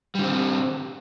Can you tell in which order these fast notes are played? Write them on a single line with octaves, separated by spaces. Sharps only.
G3 D3 C4